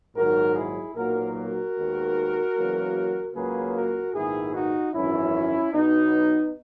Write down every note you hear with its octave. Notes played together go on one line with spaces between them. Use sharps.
A#1 G#2 D#3 F#3 F#4 A#4
E4 G#4
B1 A#2 F#3 A#3 F#4 A#4
F#4 A#4
D#2 D#3 G#3 B3
E2 C#3 F#3 A#3
C#2 C#3 F#3 A#3 G#4 B4
F#4 A#4
A#1 G#2 D#3 G#3 B3 E4 G#4
D#4 F#4
G#1 F#2 E3 C#4 E4
B1 B2 F#3 B3 D#4